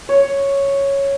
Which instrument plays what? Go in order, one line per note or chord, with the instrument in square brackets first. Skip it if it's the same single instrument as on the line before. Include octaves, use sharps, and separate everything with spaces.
[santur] C#5